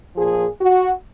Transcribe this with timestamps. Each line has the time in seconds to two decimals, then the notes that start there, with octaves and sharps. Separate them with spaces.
0.16 A#2 F3 G#4
0.60 F#4